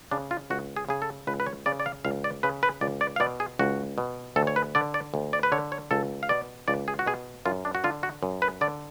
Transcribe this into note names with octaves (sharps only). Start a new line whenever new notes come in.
C#3 D4
F4
C#2 F#4
G#4
C#3 G#4
A4
C#2 B4
B4
C#5
C#3 D5
D5
F5
C#2 F5
D5
C#3 B4
B4
C#2 D5
D5
F5
B2 D5
G#4
C#2 F#4
B2
D2 A4
C#5
B4
D3 D5
D5
D2
D5
B4
D3 C#5
C#5
C#2 A4
F5
B2 D5
C#2 D5
G#4
F#4
B2 G#4
F#2 F4
D4
F#4
D3 F4
F#4
F#2
B4
D3 D5